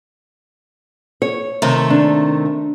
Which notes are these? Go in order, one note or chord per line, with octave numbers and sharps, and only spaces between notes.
C#5
C3 D#3 A3
D4